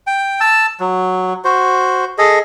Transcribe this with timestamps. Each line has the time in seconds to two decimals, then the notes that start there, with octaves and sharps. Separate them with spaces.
0.07 G5
0.40 A5 E6
0.80 F#3
1.44 F#4 C5
2.18 G#4 A4 D#5